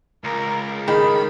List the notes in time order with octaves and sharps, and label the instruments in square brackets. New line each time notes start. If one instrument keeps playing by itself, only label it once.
[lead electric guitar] C#2 [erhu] A#4
[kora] D#3 [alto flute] G#4 [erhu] B5